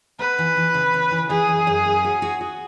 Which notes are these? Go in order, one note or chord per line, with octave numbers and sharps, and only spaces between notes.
B3 B4
E3
E3
C#3
C#3
E3
E3 G#4
F#2
F#2
C#4
F#4
F#4
F#4